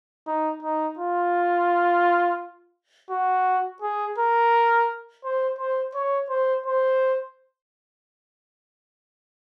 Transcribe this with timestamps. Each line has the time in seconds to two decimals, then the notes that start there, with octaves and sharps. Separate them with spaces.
0.27 D#4
0.63 D#4
0.99 F4
3.11 F#4
3.82 G#4
4.18 A#4
5.24 C5
5.59 C5
5.94 C#5
6.29 C5
6.66 C5